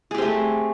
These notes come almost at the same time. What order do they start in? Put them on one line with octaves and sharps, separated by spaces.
G#4 G4 C4 A3